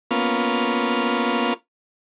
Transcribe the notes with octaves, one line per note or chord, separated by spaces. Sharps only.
A#3 B3 C#4 F4